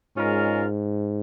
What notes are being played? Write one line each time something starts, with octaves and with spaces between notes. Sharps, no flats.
G#2 G#3 C#4 F4 A#4